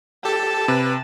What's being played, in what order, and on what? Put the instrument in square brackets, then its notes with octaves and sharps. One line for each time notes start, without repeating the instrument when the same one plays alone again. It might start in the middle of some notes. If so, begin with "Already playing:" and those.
[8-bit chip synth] G4 A4 [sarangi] A5
[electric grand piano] C3 [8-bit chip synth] B4